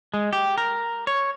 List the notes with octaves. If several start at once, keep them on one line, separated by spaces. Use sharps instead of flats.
G#3
G4
A#4
C#5